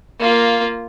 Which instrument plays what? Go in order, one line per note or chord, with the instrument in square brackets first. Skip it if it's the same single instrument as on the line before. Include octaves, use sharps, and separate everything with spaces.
[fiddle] A#3 F4